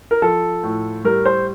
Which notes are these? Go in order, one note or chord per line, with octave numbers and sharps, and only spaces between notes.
A#4
F3 A4
A2
G3 A#4
C5